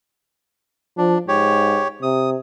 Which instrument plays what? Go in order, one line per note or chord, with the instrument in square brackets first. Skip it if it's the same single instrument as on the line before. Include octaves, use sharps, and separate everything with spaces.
[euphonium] F3 [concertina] D4
[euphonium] G#2 [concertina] G4 C#5
[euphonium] C3 [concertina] D#6